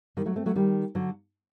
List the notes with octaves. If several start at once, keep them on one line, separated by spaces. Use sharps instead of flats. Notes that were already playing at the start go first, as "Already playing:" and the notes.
D#3 G3
F#3 A3
A3 C4
F#3 A3
D#3 G3
D3 F#3